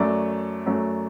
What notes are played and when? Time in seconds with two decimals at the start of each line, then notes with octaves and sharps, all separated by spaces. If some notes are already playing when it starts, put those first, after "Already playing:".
Already playing: F#2 F#3 A3 D5
0.66 F#2 F#3 A3